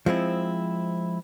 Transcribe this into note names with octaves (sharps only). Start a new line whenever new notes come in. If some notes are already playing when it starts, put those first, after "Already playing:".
F3 G#3 C4 E4